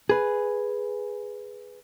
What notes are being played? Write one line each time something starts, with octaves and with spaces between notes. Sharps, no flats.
G#4 B4